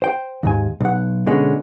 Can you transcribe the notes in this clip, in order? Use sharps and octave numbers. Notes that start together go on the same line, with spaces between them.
C5 G5
D#2 G#2 G#5
B1 F#5
B2 D3 G#3 C#4